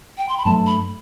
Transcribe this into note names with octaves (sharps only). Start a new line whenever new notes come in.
G5
C6
B5
G2 F#3 A3 A5
B5